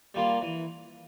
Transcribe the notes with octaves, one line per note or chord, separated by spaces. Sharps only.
G3 A#3 F4
E3